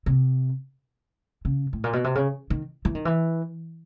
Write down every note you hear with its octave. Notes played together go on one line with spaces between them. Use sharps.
C3
C#3
A2
A#2
B2
C3
C#3
D#3
E3
D#3
E3